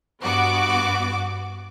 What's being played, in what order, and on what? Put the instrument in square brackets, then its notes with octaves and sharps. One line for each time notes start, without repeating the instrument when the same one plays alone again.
[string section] G2 B3 F#4 D6